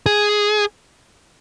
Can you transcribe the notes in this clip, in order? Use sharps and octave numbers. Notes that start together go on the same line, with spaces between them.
G#4